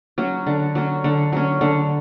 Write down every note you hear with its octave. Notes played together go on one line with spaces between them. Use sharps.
F#3 C#4
D3
F#3 C#4
D3
F#3 C#4
D3